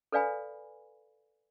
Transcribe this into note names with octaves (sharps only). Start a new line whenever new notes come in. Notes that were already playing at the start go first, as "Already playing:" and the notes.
A4 B4 D5 F5 G#5 B5